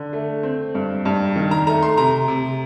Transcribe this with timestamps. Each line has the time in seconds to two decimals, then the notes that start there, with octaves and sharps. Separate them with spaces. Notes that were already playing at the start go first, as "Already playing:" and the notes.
Already playing: D3
0.13 A3
0.43 C4
0.75 G2
1.05 G2
1.36 D#3
1.51 A#5
1.67 A3 A#5
1.83 C6
1.98 C3 A#5
2.28 C3